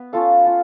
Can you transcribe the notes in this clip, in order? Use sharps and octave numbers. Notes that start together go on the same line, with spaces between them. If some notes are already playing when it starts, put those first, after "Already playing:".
Already playing: B3 B4
C#4 F4 A4 F5
F4